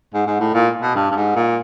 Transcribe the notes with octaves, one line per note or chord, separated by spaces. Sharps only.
G#2
G#2
A2
A#2
B2
G2
G2
G#2
A#2